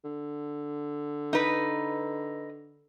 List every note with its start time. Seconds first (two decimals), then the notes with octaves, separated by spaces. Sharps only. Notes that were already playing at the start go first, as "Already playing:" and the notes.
0.04 D3
1.33 D#4 B4